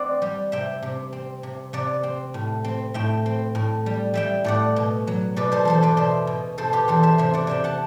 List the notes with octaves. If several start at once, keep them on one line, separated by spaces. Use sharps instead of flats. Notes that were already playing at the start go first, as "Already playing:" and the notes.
Already playing: C4 D5 F#5
G3
C3 E5 G5
C3
C4
C3
C3 D5 F#5
C4
A2
C4
A2 E5 G5
C4
A2
G3
G3 E5 G5
A2 D5 F#5
B2
F#3
B2 B4 D5
A4 C5
E2 A4 C5
B4 D5
B2 C5 E5
B2
B2 A4 C5
G4 B4
E2 A4 C5
C5 E5
C3 C5 E5
D5 F#5
C3 E5 G5
F#5 A5